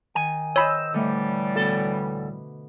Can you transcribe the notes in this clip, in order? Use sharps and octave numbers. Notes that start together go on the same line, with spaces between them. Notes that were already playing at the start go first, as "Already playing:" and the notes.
D#3 G#5
C5 C#5 D#5 B5 E6
A2 D3 E3 G3 A3
D2 B2 A4